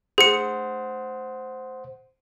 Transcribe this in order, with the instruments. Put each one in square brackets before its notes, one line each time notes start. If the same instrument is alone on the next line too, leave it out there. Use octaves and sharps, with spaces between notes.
[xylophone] G#4 C#7 [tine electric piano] C5 F#5